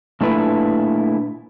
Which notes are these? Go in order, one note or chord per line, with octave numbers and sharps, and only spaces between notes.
A#2 A3 D4 E4 B4